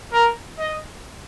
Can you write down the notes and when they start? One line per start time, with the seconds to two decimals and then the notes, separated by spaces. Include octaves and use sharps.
0.13 A#4
0.59 D#5